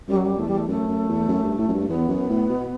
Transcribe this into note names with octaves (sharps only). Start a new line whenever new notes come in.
F#2 G3
F#3
G3
E2 A3
G3
A3
F#2 A3
F#2
E2
F#2
G2
A2
F#2
G2
E2 B3
F#2
A2
B2